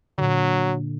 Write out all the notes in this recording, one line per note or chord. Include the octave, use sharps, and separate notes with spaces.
A#2 D3 F#3